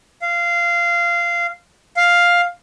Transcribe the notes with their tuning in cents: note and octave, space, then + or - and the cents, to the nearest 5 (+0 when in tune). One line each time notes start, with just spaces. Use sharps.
F5 -15
F5 +5